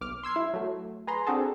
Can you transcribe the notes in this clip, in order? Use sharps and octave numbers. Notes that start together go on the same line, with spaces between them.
B1 D6 F6
C6 E6 G#6 C7
E4
F#3 A3
G#4 B4 A#5 C6
C4 D4 F#4 G#4 A4